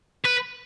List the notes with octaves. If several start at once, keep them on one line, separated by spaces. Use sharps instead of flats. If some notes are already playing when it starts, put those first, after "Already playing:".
B4